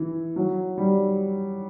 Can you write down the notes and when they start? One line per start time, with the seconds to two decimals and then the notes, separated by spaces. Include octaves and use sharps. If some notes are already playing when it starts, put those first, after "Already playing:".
Already playing: E3
0.36 F#3
0.78 G3